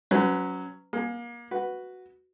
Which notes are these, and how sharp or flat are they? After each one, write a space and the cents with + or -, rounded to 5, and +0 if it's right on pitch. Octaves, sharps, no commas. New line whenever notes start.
F#3 +0 C#4 +5 B4 +30
A#3 +30 G#4 +0
F#4 +0 B4 +0